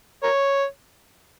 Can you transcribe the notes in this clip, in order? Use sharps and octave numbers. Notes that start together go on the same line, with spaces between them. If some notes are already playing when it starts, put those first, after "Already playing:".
A#4 C#5